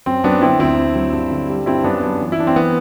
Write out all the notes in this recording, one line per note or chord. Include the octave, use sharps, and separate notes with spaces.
F#2 C4
F#3 B3 D4
D3 C4 E4
D2 C4 E4
D3
F#3
G2
D3
G3
G2 C4 E4
F#2 B3 D4
F#2
E3
E4
E3 D4
C4
E3 B3